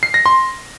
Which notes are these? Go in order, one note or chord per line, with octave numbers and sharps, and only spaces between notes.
C7
A#6
C6